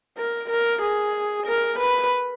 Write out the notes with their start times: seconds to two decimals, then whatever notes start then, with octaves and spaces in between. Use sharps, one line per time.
0.18 A#4
0.50 A#4
0.82 G#4
1.47 A#4
1.79 B4